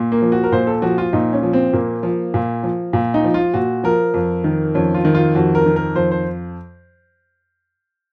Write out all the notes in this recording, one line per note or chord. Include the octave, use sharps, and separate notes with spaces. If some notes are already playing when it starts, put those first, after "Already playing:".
Already playing: A#2
A#3
F3
F#4
A#4
A#2 C5
A4
F3 F#4
F4
A#2 D#4
C#4
F3
C4
A#2 A#3
F3
A#2
F3
A#2
D#4
F3
F4
A#2 F#4
F3 A#4
F2
D#3
F2 C#4
F4
D#3
F4
F2 F#4
A#4
D#3
A#4
F2 C5
C5